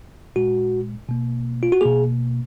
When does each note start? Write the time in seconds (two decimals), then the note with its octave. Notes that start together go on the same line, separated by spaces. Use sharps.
0.36 A#2 G#3 F#4
1.09 B2 A#3
1.63 F4
1.72 F#4
1.81 B2 A#3 G#4